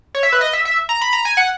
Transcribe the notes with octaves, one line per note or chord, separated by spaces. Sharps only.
C#5
E5
B4
D#5
E5
E5
A#5
B5
A#5
G#5
F#5